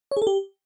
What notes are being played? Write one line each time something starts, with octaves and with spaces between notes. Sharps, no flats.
C#5
G#4
A4
G4